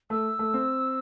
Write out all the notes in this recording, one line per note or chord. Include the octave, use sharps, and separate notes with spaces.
A3 E6
A3
C4